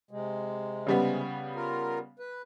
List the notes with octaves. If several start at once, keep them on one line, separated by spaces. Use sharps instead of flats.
C3 G#3
C#3 G3 B3
F4 A#4
B4